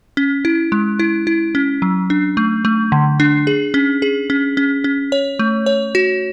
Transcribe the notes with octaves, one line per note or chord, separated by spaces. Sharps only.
C#4
E4
G#3
E4
E4
C#4
F#3
D4
A3
A3
D3
D4
G#4
C#4
G#4
C#4
C#4
C#4
C#5
A3
C#5
F#4